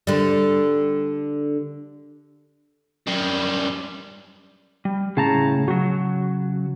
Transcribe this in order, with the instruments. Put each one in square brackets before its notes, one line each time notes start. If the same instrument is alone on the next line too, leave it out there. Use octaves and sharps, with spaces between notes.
[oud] D3 G3
[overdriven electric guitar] F#2 G3
[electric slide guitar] G3
[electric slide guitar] A2 A5 A#5 [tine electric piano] C#3
[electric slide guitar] C#3 F#3 [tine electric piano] F#4